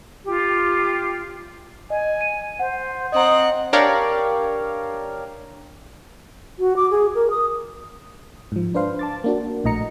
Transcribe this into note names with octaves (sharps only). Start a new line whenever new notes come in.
F4 G4
D#5 G#5
D#7
C5 F#5
C4 D#5 F#5 A#5 D#6
D4 G4 A#4 C#5 D5 F5
F#4
D6
G#4
A#4
D#6
G#2 F3
D4 B4 C5 F5 C6
A5 D6 A6
A#3 D4 F#4
A#1 A2 D#5 A#5 C#7